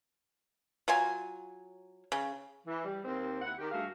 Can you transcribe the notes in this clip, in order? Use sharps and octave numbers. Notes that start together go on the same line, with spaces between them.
F#3 F4 G#5
C#3
E3
G3
D#2 C4
D#2 E4 F#5
D#3 G4
G2 A3 F#4 G#4 F5